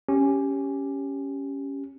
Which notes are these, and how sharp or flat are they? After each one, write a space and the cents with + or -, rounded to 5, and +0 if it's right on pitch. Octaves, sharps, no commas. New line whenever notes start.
C#4 +0 G4 +0